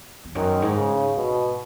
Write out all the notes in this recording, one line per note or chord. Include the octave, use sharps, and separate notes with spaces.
E2
F#2 D#3
G#2
C#3
G#2 B2